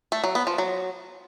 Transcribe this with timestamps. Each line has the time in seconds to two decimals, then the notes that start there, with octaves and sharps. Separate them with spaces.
0.12 A3
0.24 F#3
0.35 B3
0.47 F3
0.58 F#3